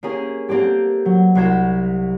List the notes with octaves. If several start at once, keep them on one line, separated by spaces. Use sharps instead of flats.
A#3 C4 C#4 G4 G#4
A#3 C4 D4 G4 A4
F#3
C2 F#4 C5 G#6 B6 E7